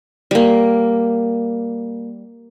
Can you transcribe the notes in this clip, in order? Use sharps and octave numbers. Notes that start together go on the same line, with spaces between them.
G3 A#3